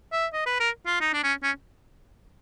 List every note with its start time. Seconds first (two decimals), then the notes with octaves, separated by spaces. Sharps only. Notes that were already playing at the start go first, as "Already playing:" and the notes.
0.12 E5
0.33 D#5
0.46 B4
0.60 A#4
0.87 F4
1.01 D#4
1.14 D4
1.24 C#4
1.43 C#4